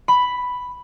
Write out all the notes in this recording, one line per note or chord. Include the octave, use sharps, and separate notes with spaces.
B5